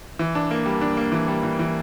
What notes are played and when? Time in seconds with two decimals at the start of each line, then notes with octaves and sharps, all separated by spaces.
0.19 E3
0.35 D4
0.51 A#3
0.66 G3
0.81 D4
0.97 A#3
1.12 E3
1.28 G3
1.43 E3
1.59 E3